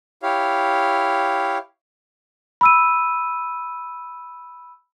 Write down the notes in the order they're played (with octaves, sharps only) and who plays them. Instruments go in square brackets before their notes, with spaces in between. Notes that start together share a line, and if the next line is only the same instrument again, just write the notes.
[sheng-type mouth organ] E4 G4 C#5 F5
[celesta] B5 E6 D#7